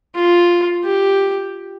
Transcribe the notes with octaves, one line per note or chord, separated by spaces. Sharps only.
F4
G4